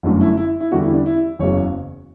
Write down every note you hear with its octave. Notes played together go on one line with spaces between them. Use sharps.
G1 F#2 D3 F#3 A3
E4
E4
E4
E2 D3 G3 F#4
E4
D4
E4
F#1 E2 C#3 F#3 C#5